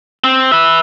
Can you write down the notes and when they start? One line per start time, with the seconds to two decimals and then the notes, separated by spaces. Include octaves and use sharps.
0.24 C4
0.52 B4 E5